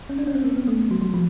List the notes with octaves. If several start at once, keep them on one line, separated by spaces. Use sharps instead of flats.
C#4
D4
C#4
C4
A#3
B3
A3
F#3
F#3
F3